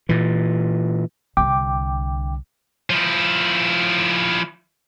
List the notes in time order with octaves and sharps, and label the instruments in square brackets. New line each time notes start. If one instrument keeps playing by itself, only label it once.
[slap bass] A#2 E3
[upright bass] C2 D3 [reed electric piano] G5 D6
[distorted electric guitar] F3 E4